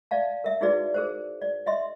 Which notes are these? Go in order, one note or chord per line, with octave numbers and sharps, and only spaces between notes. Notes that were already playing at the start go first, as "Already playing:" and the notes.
D5 E5 F5 A5
A#4 E5
D#4 E4 F#4 G#4 B4 D5
G#4 A#4 C5
D5
D#5 E5 C6